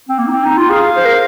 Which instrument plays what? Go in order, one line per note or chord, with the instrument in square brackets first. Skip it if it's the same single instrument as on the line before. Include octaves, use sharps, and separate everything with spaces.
[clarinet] C4
A#3
D#4
C4
D#4
F4
[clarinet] G#4 [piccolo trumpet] F5
[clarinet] C5
A#4